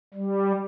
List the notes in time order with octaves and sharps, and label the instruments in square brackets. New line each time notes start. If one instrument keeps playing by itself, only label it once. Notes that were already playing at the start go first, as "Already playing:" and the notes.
[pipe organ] G3